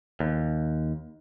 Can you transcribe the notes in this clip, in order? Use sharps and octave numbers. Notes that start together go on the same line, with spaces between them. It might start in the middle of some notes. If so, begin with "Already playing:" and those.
D#2